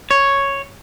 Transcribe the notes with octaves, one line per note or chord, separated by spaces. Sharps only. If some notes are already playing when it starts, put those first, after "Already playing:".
C#5